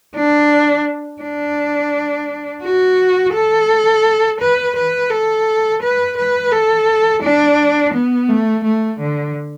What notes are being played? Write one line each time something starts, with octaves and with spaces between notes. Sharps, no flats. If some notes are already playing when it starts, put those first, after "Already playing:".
D4
D4
F#4
A4
B4
B4
A4
B4
B4
A4
D4
B3
A3
A3
D3